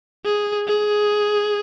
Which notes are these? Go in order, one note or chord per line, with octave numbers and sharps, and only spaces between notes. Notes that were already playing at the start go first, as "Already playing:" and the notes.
G#4
G#4